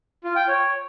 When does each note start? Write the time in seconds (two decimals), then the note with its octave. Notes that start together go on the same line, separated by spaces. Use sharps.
0.24 F4
0.36 G5
0.48 C#5